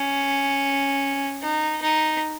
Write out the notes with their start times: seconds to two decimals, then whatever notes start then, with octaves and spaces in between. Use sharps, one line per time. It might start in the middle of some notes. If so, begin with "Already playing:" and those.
Already playing: C#4
1.42 D#4
1.82 D#4